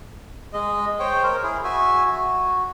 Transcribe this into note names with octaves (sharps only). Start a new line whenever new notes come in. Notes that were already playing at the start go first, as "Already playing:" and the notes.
G#3 D#5
C5 C#5 G5
A#4 C5
E4 G#4
F#4 E5 G#5
F#4